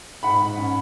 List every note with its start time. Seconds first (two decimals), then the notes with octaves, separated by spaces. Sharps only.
0.23 G#2 F#5 B5
0.41 G#2
0.58 C#4